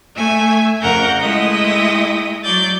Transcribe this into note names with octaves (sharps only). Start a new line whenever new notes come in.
A3 E5 G#5 G#6
F2 C#3 A#4 F#5 A#5 G6
G#3 A3 E4 D#5 G5 D#6
F#3 D5 G6 A6